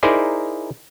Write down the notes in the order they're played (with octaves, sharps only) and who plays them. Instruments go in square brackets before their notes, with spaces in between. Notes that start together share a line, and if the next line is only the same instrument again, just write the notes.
[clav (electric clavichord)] D#4 E4 G#4 A#4 C5 D5